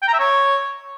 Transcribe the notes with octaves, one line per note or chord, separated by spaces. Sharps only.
G5
A#5
E5
C#5